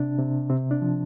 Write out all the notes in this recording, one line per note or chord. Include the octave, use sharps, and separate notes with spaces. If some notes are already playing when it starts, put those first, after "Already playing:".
Already playing: C3 D4
C3
C3 C4
D4
F3